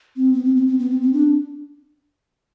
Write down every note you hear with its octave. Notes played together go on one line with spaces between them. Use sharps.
C4
B3
C4
C4
C4
B3
C4
C4
D4